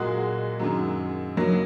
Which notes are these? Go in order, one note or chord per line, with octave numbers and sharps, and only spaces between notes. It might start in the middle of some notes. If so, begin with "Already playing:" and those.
Already playing: A#2 F#3 G#3 A#3 F#4 D#5
F#2 D#3 F#3
F#2 C#3 F#3 A#3 D#4